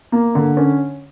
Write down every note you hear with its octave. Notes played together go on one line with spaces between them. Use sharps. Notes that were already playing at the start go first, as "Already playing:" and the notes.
A#3
D3
C#4